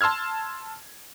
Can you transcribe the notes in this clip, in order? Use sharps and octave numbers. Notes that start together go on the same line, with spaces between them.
A5 C6 E6 F6 G#6